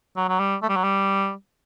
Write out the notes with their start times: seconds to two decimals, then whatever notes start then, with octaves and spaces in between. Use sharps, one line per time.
0.17 F#3
0.29 F#3
0.40 G3
0.63 A3
0.69 G3
0.76 F#3
0.84 G3